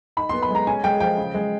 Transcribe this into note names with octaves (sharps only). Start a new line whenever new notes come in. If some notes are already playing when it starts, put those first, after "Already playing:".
D#4 B5
B3 C6
B5
G#3 A#5
C#4 G#5
G#3 G5
F3 G5
C#3
G#3